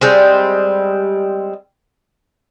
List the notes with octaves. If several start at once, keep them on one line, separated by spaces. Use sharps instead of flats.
G3 G#3 C4